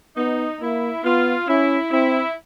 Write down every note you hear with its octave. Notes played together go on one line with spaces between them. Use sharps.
B3 D#4
A#3 E4
B3 F4
C#4 E4
C4 E4